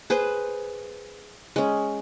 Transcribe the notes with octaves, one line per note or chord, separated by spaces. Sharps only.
G#4 B4 C5
G#3 C#4